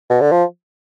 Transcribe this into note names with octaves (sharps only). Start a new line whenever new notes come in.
B2
D3
F3